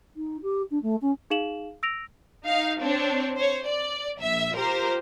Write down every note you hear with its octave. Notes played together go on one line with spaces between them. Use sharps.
D#4
G4
D4
A3
C#4
D#4 G#4 F5 E7 F#7
E6 A#6 D7 F7
D#4 F5
C4 D4 C#5
C5 C#5
D5
A#1 E5
F4 G4 A#4 C5